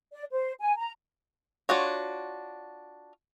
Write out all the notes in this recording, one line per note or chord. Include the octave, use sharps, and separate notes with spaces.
D5
C5
G#5
A#5
D4 F4 F#4 C#5